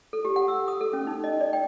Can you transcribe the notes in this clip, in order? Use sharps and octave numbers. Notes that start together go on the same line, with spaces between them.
A4
G4
F#5
E6
D#6
A4
C#4
D#4
D#5
D5
G5